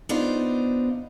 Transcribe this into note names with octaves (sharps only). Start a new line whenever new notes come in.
B3 D4 D#4 F4 C5